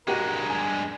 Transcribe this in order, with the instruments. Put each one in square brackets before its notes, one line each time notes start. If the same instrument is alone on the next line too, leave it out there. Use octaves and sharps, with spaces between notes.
[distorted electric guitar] G2 G#3 [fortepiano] F#4 G4 F#5 [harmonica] A#4
[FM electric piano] G#5